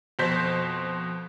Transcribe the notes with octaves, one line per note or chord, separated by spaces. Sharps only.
F2 B2 C5 G6 B6